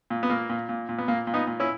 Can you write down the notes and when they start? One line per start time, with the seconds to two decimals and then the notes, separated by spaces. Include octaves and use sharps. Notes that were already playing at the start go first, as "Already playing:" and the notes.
0.10 A#2
0.23 B3
0.30 A#2 A#3
0.50 A#2
0.69 A#2
0.89 A#2
0.98 B3
1.08 A#2 A#3
1.27 A#2
1.34 B3 D#4
1.47 A#2
1.60 C#4 E4